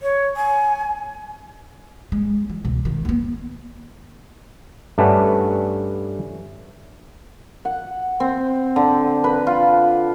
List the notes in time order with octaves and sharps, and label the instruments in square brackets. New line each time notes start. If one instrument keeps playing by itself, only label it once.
[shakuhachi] C#5
G#5
[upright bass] G#3
E3
C#2 B2
D#3
D#2 B3
[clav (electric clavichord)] G2 A3 C#4 D4 B4 F#5
[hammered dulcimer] F#5
C4
D3
B4
F4